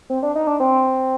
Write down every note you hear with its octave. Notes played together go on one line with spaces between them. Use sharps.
C4
D4
D#4
D4
C4